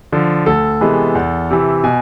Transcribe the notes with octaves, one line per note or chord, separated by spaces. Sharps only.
D3 F3
D2 A4
C3 E3 G#3 B3
E2
C3 E3
B2 G#5